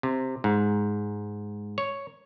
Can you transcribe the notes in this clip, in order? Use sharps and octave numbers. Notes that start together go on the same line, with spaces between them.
C3
G#2
C#5